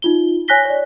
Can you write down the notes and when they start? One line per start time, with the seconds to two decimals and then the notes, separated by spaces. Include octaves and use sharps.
0.02 D#4 F4 G7
0.48 C#5 G#5 F#6 A#6 B6 G7
0.65 C#5 D5